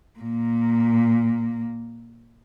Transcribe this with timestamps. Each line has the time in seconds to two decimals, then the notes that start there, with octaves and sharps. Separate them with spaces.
0.19 A#2 A#3